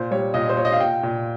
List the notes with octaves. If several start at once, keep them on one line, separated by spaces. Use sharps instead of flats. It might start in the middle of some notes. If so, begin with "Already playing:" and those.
Already playing: A#2 C5
G3 C#5
A#2 D#5
C5
A#2 C#5
D#5
F5
A#2 G5
A#2